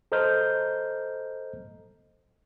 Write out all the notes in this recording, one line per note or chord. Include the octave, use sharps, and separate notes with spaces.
A4 C5 D#5 A#5 F6 G6